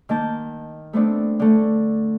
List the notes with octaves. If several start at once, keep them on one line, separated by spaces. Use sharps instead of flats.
D#3 A#3 A5 G6
A3 B3 C4 D4
D3 A3